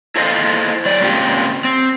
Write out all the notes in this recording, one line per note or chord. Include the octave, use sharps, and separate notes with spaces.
E4 A4 C5 D#5 F5
F#3 D5
G#2 C#3 A#3 C4 F4 G4
C4